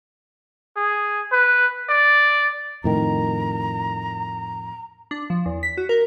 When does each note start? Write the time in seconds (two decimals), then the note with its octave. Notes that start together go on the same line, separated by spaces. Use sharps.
0.77 G#4
1.32 B4
1.89 D5
2.84 F2 A2 D#3 A#5
5.11 D4
5.30 F3
5.46 E2
5.63 B6
5.77 F#4
5.89 A#4